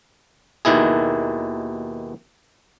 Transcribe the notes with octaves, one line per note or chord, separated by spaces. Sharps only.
D#2 B2 D#3 E4 G#4